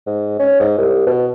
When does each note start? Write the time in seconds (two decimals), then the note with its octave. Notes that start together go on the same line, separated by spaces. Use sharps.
0.07 G#2
0.39 C#4
0.60 G#2
0.78 C2
1.07 B2